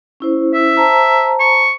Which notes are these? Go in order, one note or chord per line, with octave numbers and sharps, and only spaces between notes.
C#4 E4 C5
E5
C5 A5 A#5
C#6